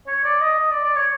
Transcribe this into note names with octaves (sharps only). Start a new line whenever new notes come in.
C#5
D5
D#5
D#5
D5
D5
C#5